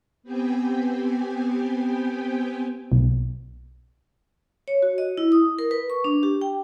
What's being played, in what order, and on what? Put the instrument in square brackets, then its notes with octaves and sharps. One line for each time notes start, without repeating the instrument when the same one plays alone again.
[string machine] B3 C4 G4 G5 G#5
[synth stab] B1
[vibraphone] C#5
F#4
D#5
E4
D#6
A#4
B4
C#6
D4
G4
G5